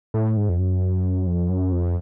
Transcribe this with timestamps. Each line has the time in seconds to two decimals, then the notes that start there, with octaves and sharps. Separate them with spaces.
0.14 A2
0.37 G#2
0.49 F2
0.59 F#2
1.27 F2
1.49 F#2
1.72 F2